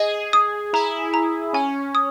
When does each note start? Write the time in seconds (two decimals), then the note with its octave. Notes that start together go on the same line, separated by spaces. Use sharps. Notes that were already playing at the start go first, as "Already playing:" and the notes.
Already playing: G#4 D#5
0.33 D#6
0.73 E4 A#5
1.14 A#5
1.53 C#4 G#5
1.95 D#6